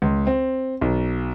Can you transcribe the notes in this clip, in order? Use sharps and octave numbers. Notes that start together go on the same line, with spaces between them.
C#2
C4
B1